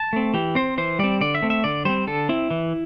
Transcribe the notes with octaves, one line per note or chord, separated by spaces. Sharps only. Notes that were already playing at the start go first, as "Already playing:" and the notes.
Already playing: A5
A3 C4
E3 G4
C4 C5
E3 C5
G3 C4 D5
D3 D5
E5
A3 C4
E5
D3 D5
G3 C4 C5
D3 A4
C4 E4
E3